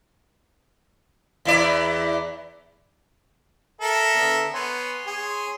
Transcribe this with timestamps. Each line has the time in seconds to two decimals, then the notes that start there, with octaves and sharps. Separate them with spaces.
1.45 E2 E4 D5
3.81 A4 A#4 E5
4.15 D3 B3
4.54 B3 C#5 G#5 C6
5.06 G#4